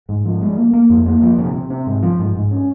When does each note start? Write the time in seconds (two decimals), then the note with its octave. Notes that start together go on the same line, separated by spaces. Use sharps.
0.09 G#2
0.25 F3
0.41 G#3
0.57 A#3
0.73 A#3
0.90 F2
1.06 A#3
1.22 F3
1.38 C3
1.54 C3
1.70 C4
1.87 G#2
2.03 F3
2.19 G#2
2.35 G#2
2.51 C#4